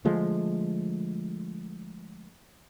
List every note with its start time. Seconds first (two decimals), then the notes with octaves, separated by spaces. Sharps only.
0.05 D3 F3 G#3 A3